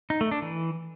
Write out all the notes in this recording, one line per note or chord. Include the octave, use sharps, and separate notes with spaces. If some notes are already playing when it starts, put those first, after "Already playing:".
D#4
A3
D4
E3